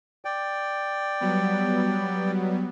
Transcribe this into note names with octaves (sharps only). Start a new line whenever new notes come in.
D5 G5
F#3 G3 B3